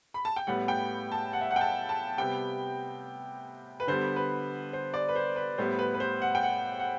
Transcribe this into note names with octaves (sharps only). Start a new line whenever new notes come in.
B5
A5
G5
A2 G3 B3 F#5
G5
A5
F#5
E5
F#5
G5
A5
A5
C3 G3 B3 G5
B4
D3 G3 B3 C5
B4
C5
D5
B4
C5
B4
A2 G3 B3 C5
B4
B4
C5
F#5
G5
F#5
F#5